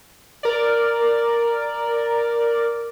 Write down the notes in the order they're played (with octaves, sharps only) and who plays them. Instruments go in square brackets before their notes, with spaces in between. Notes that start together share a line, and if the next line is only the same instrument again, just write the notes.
[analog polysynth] A#4 D5